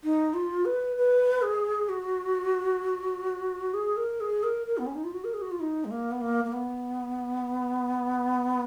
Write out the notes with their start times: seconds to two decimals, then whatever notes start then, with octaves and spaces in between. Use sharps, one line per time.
0.04 D#4
0.34 F4
0.65 B4
0.97 B4
1.42 G#4
1.89 F#4
3.74 G#4
3.97 A#4
4.21 G#4
4.43 A#4
4.67 A#4
4.78 B3
4.86 C#4
4.95 D#4
5.04 F4
5.14 F#4
5.24 A#4
5.34 G#4
5.42 F#4
5.51 F4
5.60 D#4
5.85 G#3
5.91 A#3
6.11 B3
6.21 A#3
6.45 A#3
6.52 B3